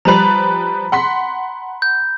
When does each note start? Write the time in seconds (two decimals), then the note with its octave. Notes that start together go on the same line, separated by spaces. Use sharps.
0.05 F3 G3 B4 A#5 B5
0.92 F#5 C6 B6
1.82 G6